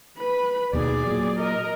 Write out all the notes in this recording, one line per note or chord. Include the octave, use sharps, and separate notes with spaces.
B4 B5
D#2 B2 D#3 G#4 D5
A#2 F#3
A#4 D#5